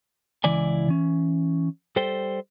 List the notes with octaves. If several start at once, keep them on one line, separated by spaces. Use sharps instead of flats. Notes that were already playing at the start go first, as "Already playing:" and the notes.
C#2 C#3 E3 E4 D5 G#5
E3 C#4
G3 A4 C5 G5